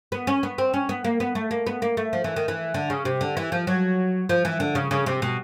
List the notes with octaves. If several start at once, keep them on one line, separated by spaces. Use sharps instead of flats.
B3
C#4
B3
C4
C#4
B3
A#3
B3
A3
A#3
B3
A#3
A3
F3
E3
D#3
E3
D3
C#3
C3
D3
E3
F3
F#3
F3
E3
D3
C#3
C#3
C3
B2